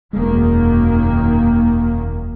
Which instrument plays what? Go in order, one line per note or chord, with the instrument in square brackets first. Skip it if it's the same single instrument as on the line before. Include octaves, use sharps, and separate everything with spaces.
[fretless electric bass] E1 G#3 [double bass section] F#2 D#3 A#3